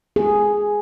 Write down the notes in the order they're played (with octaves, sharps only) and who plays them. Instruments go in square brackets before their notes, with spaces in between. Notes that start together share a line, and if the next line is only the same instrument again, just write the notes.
[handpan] G#4